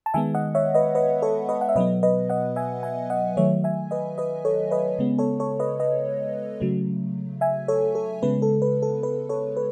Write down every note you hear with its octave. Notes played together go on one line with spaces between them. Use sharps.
A5
D#3 G#3 B3 E5 G#5
D#5 F#5
C#5 E5
B4 D#5
B4 D#5
A4 C#5
B4 D#5
F#5
E5
B2 F#3 B3 B4 D#5
B4 D#5
D#5 F#5
E5 G#5
E5 G#5
D#5 F#5
D#3 F#3 A3 C#5 E5
E5 G#5
B4 D#5
B4 D#5
A4 C#5
B4 D#5
C#3 G#3 B3
A4 C#5
A4 C#5
B4 D#5
B4 D#5
C#3 F#3 A3
E5 G#5
A4 C#5
A4
C#3 G#3 B3 B4
A4
B4
A4
B4
A4 C#5
B4